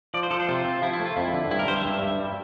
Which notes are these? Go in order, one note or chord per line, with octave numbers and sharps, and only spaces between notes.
F3 D5
C5
F3 A4
C5
C3 F4
C4
F3 E4
E4
A3
F4
F2 E4
D3
G2 E4
A#4
G2 C5
E5
G2
G2
G3